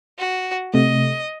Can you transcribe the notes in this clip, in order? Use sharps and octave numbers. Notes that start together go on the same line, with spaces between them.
F#4
C3 A3 D#5